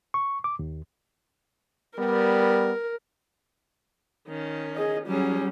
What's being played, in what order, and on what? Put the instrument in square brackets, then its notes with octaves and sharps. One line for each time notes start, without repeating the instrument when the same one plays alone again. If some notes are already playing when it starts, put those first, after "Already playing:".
[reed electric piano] C#6
D6
D#2
[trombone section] G3 B3 [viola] A#4
[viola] D#3 C#4
[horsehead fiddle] G#4 D#5
[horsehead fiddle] F#3 C#4 [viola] G3 G#4